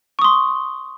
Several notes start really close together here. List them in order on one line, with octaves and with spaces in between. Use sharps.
C#6 D#6 C6